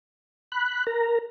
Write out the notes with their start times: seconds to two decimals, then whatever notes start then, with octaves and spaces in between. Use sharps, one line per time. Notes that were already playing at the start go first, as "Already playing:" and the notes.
0.52 B5 F#6
0.87 A#4 A#5